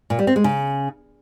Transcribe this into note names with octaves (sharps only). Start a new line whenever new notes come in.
A#2
G3
C4
G#3
C#3